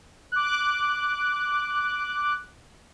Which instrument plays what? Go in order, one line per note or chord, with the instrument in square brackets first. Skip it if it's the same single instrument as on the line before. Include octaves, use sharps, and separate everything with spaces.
[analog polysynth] D6 F#6